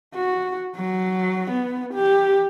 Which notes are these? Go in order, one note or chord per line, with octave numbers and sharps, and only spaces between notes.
F#4
F#3
B3
G4